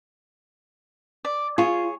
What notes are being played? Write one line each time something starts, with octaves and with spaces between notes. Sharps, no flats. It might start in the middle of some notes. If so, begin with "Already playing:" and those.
D5
F4 G#4 C#5